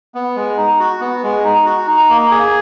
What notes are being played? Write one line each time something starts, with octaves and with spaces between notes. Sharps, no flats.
B3
G#3
D#4
F#4
B3
G#3
D#4
F#4
D#4
A#3
G#4